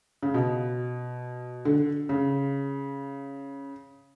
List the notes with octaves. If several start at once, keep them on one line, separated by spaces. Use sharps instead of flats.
C#3
B2
D3
C#3